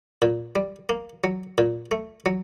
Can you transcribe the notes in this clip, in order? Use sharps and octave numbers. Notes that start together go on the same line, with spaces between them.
A#2
G3
A#3
F#3
A#2
A3
F#3